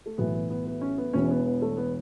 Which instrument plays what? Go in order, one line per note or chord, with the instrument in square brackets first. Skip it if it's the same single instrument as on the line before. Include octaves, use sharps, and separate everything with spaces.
[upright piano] A3
[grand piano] B1 A2 E3 [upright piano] B3
[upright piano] B3
B3
B3
C#4
B3
[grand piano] E1 E2 E3 [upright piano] C#4
[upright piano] B3
B3
A3
B3